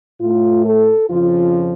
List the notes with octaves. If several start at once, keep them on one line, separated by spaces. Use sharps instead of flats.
A2 A3 F4
A4
F2 C#3 F3 F4